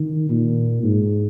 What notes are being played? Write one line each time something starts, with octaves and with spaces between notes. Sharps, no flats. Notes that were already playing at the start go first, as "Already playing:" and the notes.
Already playing: D#3
A#2
G#2